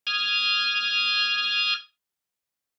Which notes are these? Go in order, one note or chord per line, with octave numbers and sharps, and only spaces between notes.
D#6 F6 G#6